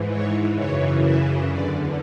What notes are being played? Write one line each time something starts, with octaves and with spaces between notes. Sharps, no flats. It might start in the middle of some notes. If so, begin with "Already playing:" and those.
Already playing: G#2 E3
C#5
F#2 C#3 E3 C#5
E5
E2 D3 D5